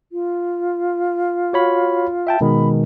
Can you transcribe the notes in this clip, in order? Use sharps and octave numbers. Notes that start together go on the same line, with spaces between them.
F4
F#4 C#5 B5
E5 G5 A5
B2 D#3 G#3 B5